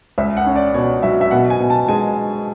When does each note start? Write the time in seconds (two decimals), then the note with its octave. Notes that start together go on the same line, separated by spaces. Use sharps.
0.18 C#2 E5
0.37 F#5
0.46 C#4
0.56 D5
0.74 B2 C#5
1.03 F#3 E5
1.21 E5
1.31 B2 F#5
1.50 G#5
1.60 B2
1.70 A5
1.88 G#3 G#5